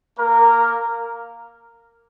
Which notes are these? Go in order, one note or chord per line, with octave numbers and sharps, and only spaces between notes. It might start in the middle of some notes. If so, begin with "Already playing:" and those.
A#3 A#4